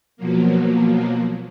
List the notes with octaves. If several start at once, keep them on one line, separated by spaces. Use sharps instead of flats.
B2 F3 F#3 A#3